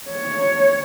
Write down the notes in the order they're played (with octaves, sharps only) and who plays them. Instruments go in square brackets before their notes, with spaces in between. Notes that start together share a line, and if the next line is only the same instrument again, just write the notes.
[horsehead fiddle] C#5